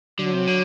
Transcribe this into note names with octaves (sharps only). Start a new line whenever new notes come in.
D3 F#3
C3
D3